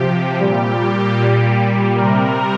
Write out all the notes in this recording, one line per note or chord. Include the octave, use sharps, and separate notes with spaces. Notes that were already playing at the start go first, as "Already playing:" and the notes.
Already playing: C3 F3 G4
A#2 G3 G4
A#2 G3
C3 G3 A#4